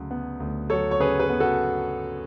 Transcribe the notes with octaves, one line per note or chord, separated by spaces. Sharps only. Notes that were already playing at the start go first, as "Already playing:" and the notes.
Already playing: D2 C#3 F#3
B3
D2
F#3 A4 C#5
C#5
C#3 G#4 B4
G#4 B4
B3
F#4 A4